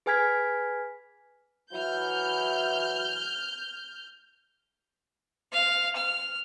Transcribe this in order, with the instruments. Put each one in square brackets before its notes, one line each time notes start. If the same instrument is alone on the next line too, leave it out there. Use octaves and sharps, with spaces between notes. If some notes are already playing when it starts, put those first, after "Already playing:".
[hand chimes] G#4 B4 G#5 F6 G#6 B6
[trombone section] E3 F#3 E4 [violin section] F6 G6
[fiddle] F5
F6